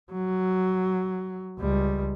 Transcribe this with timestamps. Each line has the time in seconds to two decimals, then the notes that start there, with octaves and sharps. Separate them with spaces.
0.12 F#3
1.59 C#2 G3